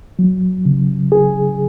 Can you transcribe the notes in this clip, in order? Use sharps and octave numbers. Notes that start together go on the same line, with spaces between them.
F#3
C#3
G#4